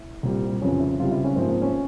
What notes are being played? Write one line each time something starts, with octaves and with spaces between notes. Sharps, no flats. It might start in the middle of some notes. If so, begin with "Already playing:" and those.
Already playing: E4
C2 A#2 G3 C4
F2 C#3 E3 C#4
E4
C#2 C3 G3 F4
E4
C#4
G#2 F3 A#3 C4
C4
C#4